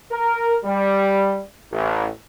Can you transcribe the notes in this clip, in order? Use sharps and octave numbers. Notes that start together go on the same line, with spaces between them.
A#4
G3
A1